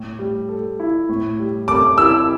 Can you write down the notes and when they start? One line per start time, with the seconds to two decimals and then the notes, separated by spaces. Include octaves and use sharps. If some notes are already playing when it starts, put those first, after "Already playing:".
Already playing: A2
0.19 G3
0.49 A4
0.80 E4
1.09 A2
1.39 G3
1.68 A4 D6
1.98 E4 E6